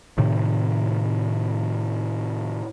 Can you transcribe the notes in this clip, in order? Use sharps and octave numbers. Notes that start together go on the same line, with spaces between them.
A2 C3 D#3